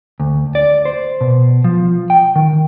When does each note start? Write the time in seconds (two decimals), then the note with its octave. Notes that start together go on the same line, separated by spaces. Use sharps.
0.20 D2
0.55 D5
0.85 C5
1.21 B2
1.64 F3
2.10 G5
2.36 D#3